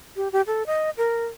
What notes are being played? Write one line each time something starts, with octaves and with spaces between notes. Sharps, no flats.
G4
G4
A4
D#5
A#4